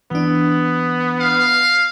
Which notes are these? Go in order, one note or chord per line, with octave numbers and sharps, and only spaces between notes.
E3 B3 D4
F5